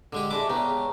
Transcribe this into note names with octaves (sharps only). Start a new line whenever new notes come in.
D3 G#3 G4
G#3 A3 D4 E4 D6
C#3 B3 G5 A#5